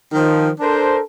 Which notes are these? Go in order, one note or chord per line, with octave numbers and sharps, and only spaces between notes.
D#3 F3
D4 A4 A#4 C5